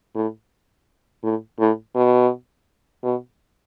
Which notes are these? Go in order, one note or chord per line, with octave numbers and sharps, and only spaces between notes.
A2
A2
A2
B2
B2